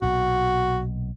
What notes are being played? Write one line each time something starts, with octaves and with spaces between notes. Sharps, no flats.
B1 A#2 F#4